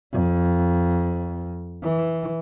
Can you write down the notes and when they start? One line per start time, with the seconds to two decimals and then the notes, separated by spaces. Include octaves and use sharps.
0.13 F2
1.83 E3